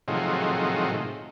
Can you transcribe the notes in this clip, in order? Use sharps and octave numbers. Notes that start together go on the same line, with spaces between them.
A2 C3 D#3 F3 F#3 G#3